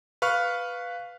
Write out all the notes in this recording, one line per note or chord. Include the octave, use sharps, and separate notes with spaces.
B4 F5 C#6 F6